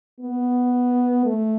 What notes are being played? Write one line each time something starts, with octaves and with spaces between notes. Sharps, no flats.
B3
A3